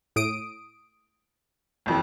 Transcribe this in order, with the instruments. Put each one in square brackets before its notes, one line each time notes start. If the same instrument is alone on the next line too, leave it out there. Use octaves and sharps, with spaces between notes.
[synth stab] A2 D#6 D7
[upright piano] F#1 F2 E3